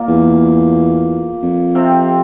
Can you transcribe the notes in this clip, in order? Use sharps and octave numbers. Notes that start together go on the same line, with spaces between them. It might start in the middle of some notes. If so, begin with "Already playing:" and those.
Already playing: A#2 A#3
E2
F2
C3 C4